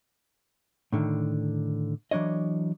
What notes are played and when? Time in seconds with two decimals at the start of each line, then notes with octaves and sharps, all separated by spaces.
0.93 A2 D3 D#3
2.11 E3 F#3 D4 C#5 D#5